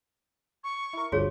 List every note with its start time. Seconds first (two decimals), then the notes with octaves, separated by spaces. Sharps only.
0.64 C#6
0.93 E4 A#4
1.12 G1 D2 F3 F#4 G#4 C#5